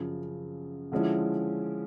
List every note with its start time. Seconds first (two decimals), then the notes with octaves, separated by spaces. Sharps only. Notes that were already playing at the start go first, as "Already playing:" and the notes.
Already playing: F#2 C#3 F3
0.92 D3 F3 G#3 C#4 E4